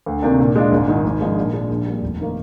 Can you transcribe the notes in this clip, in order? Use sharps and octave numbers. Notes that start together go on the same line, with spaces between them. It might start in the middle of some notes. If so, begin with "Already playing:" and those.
D2
C3 D#3 A#3 D4
A#2
G#3 D4 F4
G#1
G#2 D#3
G#1
G#2 F3 G#3 D4
A#2
G#3 D4
A#1
A#2 G3
F1
D#3 A#3